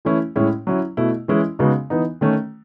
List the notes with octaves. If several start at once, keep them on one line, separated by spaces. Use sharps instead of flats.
E3 A3 C#4 E4
A2 G#3 C#4 E4
F#3 C#4 E4
B2 A3 E4
E3 G#3 C#4 E4
C#3 G#3 B3 D#4 F#4
E3 B3 D#4
D#3 A3 C#4